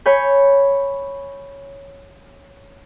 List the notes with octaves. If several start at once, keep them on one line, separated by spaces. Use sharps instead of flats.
C#5 G#5 B5 G6